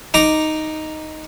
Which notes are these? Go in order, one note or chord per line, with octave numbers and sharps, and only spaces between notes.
D#4 A#5 D6